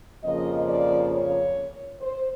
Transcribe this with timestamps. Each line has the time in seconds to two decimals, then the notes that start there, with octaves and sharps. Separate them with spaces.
0.23 F2 C#3 F3 A#3 D#5
0.68 D5
1.12 C#5
2.01 C5